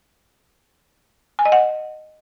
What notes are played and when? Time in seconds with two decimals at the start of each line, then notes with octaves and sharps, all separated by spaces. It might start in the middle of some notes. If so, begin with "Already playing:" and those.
1.39 G#5
1.45 D#5
1.52 F#5